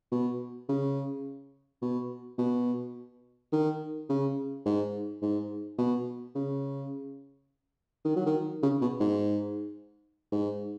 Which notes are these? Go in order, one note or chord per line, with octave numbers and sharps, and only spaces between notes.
B2
C#3
B2
B2
D#3
C#3
G#2
G#2
B2
C#3
D#3
F#3
D#3
C#3
B2
G#2
G#2